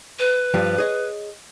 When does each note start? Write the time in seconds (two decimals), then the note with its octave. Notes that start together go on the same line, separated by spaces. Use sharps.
0.19 B4
0.54 G2 F3 G3
0.78 G#4 C#5 D#5